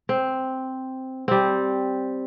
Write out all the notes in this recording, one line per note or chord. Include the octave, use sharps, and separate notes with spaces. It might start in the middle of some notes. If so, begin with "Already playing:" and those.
C4
G3 C4